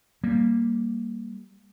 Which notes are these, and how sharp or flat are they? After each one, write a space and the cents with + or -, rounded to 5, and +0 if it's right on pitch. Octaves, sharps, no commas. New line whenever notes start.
G3 +0 A#3 +0